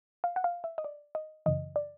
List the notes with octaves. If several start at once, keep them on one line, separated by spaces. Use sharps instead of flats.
F5
F#5
F5
E5
D#5
D5
D#5
F#2 C#3 E3 D#5
D5